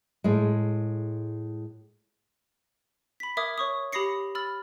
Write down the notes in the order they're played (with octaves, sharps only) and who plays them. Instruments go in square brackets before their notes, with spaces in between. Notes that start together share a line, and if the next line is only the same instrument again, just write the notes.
[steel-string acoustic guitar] A2 G#3
[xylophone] B5 B6
A#4 E5 D6 D#6 G#6
C#5 C#6 D#6
G4 B5 D#6 A#6 C7 C#7
B5 E6 F6 A6